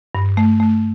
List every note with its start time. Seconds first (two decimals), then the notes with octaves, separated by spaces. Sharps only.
0.15 G2
0.37 A3
0.60 A3